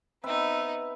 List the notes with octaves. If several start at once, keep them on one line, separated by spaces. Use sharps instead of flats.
B3 C4 D#4 B4 E5